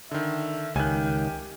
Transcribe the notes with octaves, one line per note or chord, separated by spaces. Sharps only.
D3 D#3 E5
C#2 D#3 G4 G#5 F#6